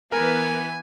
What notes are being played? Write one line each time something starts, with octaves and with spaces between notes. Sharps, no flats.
E3 B3 A#4 B4 G#5